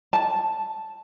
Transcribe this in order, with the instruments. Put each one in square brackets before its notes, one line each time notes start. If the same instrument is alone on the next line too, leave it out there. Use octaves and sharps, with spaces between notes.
[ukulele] A5